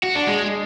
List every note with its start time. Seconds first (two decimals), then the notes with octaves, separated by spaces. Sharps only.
0.04 F#4
0.15 D4
0.27 G#3